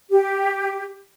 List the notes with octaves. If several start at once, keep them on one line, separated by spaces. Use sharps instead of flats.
G4